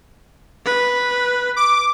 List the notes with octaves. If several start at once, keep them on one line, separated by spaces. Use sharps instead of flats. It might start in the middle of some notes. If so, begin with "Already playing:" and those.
B4
D6